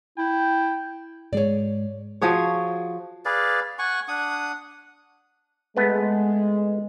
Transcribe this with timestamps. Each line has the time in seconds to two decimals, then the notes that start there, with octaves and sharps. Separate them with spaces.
0.18 E4 G5
1.33 G#2 G#3 C#5 D5
2.22 F3 F#4 G#4 C#5
3.25 G#4 B4 D5 F5
3.79 F#5 G#5 C#6
4.08 D4 F#5 D#6
5.77 G#3 A3 B3 B4